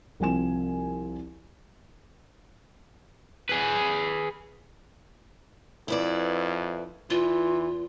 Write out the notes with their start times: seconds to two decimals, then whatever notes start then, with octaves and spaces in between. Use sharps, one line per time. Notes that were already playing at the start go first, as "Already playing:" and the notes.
0.20 C2 F3 C4 G#5 E7
3.49 G#4 B4
5.88 F2 E4 B4 D5
7.10 E2 E3 F4